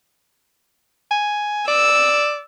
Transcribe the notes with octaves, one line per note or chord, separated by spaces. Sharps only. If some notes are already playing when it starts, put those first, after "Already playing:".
G#5
D5 E6